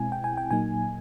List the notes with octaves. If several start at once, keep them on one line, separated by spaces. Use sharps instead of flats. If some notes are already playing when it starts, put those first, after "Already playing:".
Already playing: B2 G#3 C4 E4 G#5
G5
G#5
G5
A#2 F#3 A#3 D#4 G#5